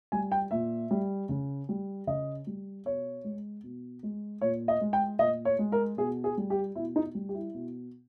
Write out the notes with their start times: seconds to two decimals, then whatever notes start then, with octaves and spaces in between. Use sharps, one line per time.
0.12 G3 G#5
0.32 G5
0.51 A#2 E5
0.91 G3
1.29 C#3
1.69 G3
2.07 C#3 D#5
2.47 G3
2.85 B2 C#5
3.24 G#3
3.63 B2
4.03 G#3
4.41 A#2 C#5
4.68 D#5
4.81 G#3
4.93 G5
5.19 A#2 D#5
5.45 C#5
5.59 G#3
5.72 A#4
5.97 B2 G#4
6.24 G#4
6.37 G3
6.50 G4
6.75 B2 E4
6.96 D#4
7.15 G3
7.29 G4
7.34 E4
7.54 B2